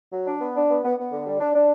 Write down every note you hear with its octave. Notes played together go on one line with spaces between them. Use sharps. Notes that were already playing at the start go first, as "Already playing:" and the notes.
F#3
D4
B3
D4
B3
B3
B3
D3
G3
D4
D4